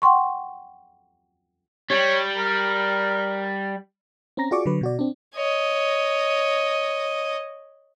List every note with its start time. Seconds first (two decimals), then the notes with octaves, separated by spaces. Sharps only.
0.02 F#5 G5 C6 C#6
1.90 G3 C#5
2.37 A#4
4.37 C4 C#4 A#5 A#6
4.51 F4 F#4 G#4 D5 C#6 D6
4.66 D3 F#3 B4
4.81 B2 F#4 D5
4.99 C4 D4
5.35 C#5 D#5